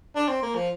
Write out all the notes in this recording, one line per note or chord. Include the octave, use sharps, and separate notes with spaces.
D4
C4
A#3
F3